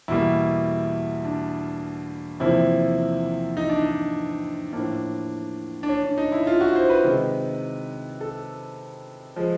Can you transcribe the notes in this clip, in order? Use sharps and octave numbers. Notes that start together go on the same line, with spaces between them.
E2 B2 G3 A#3 E4
D4
E2 C3 F3 A#3 E4
D#4
D4
D#4
A2 F3 A#3 D4
D4
C#4
D4
D#4
E4
F4
F#4
C5
B4
C3 D#3 G#3
A4
F3 G#3